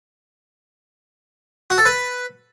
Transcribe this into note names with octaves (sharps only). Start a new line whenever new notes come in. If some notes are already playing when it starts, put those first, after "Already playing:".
F#4
A4
B4